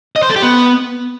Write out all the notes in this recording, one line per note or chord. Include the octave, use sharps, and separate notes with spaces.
D#5
C5
A4
G4
B3